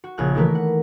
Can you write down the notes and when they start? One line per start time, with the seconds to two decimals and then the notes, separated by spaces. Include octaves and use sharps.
0.04 F#4
0.18 A#1 C#3 G#5 F6 F#6
0.35 D#3 E3 A3 A#4 B4
0.55 F#5